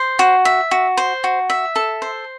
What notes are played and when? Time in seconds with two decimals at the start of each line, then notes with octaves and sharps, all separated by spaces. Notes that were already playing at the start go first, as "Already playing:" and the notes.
Already playing: C5
0.19 F#4
0.45 E5
0.71 F#4
0.97 C5
1.24 F#4
1.50 E5
1.76 A4
2.02 C5